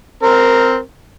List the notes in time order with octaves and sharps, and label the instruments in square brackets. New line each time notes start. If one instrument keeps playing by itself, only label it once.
[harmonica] C4 A#4